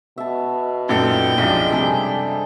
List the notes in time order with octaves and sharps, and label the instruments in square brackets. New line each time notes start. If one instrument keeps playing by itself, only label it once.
[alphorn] B2 [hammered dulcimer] E5 A5
[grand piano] F#2 A#2 A4 [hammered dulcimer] D#4 E5 [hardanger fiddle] G5
[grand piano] B1 F#2 F3 [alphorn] G#3 [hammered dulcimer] C4 D4
[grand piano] C3 G3 [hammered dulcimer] G#4 A4 D5